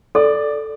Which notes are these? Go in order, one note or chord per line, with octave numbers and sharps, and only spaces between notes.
A4 D5